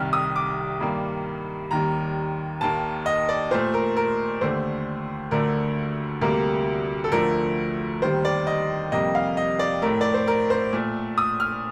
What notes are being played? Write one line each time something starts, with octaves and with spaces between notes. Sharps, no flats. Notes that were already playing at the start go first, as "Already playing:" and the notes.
Already playing: C2 C3 D#3 G3 F6
D#6
D6
G2 D#3 G3 A#3
D#2 D#3 G3 A#5
D#2 D#3 A#3 A5
D#5
D5
A#2 A3 C5
A#4
A#4
D#2 D3 A3 C5
D2 D3 A3 A#4
D2 C3 G3 A#3 A#4
A4
D2 D3 F3 A3 A#4
D#2 D#3 G3 C5
D5
D#5
F2 C3 G3 A#3 D#5
F5
D#5
D5
A2 A3 A#4
D5
C5
A#4
C5
A#2 A3
D#6
F6